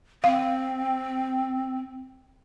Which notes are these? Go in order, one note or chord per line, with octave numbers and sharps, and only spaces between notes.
C4 F5